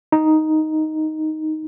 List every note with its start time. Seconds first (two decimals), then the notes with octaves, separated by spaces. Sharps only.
0.12 D#4